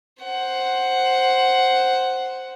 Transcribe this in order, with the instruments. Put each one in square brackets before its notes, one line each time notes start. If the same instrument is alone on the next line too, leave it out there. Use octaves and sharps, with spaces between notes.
[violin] C5 F#5